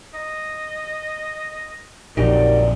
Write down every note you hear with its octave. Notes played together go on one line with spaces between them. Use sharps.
D#5
A#1 F2 F#3 D#4 G4 A#4 D5